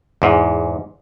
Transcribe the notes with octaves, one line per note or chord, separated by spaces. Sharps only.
E2 G#2